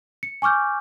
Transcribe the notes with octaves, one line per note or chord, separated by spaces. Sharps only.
C#7
G#5 C#6 D6 F6 G6